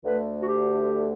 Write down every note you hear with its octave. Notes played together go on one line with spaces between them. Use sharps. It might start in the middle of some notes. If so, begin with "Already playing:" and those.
D2 D3 A3 B4
F#4
G4